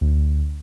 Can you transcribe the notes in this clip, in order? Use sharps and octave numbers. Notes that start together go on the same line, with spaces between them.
D2